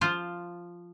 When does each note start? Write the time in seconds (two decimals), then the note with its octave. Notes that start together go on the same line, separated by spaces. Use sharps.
0.01 F3 F4 C5